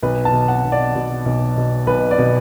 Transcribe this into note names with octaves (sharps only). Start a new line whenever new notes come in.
B1 B4
A5
B2
F#5
B1
D5
B2
B1
B2
B1 B4
D5
B2